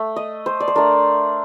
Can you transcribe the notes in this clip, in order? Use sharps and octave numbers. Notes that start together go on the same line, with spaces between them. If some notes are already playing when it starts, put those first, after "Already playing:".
Already playing: A3
D#5
C5
D5
C5
A3 D4 A#4